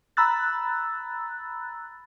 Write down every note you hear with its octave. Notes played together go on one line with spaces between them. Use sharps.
A#5 B5 E6 F#6 A6